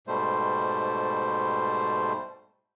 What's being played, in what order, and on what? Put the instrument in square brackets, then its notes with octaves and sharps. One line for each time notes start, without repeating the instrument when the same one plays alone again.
[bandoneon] G#2 B2 G3 A3 C5